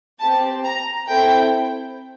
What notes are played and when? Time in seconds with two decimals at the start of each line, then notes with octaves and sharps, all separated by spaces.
0.19 C4 G4 A5
0.64 A#5
1.07 C4 E4 A4 G5